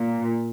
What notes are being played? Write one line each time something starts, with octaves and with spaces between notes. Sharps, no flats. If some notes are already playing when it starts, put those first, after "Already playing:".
Already playing: A#2